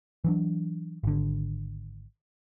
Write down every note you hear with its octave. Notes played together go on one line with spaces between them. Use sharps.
E3 F#3 D4
G#1 D3